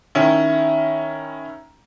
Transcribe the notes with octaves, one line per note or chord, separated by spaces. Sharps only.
D#3 C#4 E4